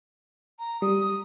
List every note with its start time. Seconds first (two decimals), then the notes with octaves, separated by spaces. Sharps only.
0.59 A#5
0.82 G3 D#6